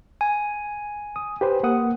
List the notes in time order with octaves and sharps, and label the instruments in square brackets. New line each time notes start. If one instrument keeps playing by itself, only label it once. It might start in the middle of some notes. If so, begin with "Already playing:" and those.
[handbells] G#5
[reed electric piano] D#6
G4 B4 C5
A#3 F#5 D#6